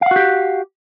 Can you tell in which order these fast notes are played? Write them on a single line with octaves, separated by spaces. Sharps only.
F5 F#5 F#4 G4